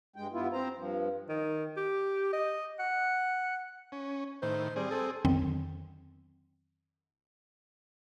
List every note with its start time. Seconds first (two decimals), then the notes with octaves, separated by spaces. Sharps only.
0.16 G2 G#3 G5
0.32 G2 B3 E4 F4
0.52 C4 C5 A#5
0.76 G2 F3
1.29 D#3
1.77 G4
2.33 D#5
2.79 F#5
3.92 C#4
4.42 A2 D#3 C5
4.76 G3 C4 G#4
4.91 A4
5.25 F2 D3 D#3 F#3 B3 C4